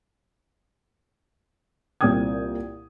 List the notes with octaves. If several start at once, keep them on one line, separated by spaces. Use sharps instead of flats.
C2 A#2 C4 G5 D#6 G#6